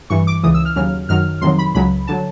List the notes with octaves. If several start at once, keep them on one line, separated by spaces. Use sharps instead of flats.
G2 E3 C#6
D6
C#2 C#3 E3 D#6
E6
F6
D#2 C#3 F#3 F6
F#2 D#3 F#3 F6
F2 C3 D#3 F#3 C6
B5
C#2 C#3 F#3 B5
D3 F#3 A5